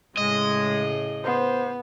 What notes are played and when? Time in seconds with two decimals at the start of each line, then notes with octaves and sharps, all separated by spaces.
0.17 A2 C#3 G#3 G#4 D#5
1.25 B3 C5